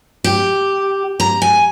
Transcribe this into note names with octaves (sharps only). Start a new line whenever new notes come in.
G4
A#5
G#5